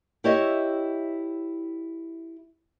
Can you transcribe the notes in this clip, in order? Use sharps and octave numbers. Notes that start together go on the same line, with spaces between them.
E4 G4 C#5 D#5 E5